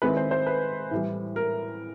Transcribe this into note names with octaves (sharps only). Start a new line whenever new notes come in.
D#3 G#3 C4 E4 B4
C5
C5
B4
A2 E3 G3
A#4